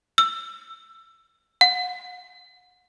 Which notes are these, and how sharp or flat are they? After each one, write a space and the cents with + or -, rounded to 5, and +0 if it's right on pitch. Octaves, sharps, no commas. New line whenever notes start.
E6 +20
F#5 -35